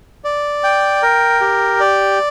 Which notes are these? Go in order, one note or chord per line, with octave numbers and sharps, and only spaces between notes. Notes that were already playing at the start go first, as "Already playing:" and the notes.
D5
G5
A#4
G4
D5